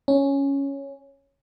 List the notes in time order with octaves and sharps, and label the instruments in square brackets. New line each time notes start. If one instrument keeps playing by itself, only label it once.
[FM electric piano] C#4